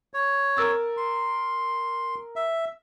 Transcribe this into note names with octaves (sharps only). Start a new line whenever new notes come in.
C#5
A#4 E6 A6
C6
E5